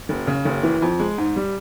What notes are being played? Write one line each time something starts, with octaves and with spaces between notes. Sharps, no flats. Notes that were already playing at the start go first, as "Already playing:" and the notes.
F#1
C#3
F#1
E3
F2
G#3
G#2
G3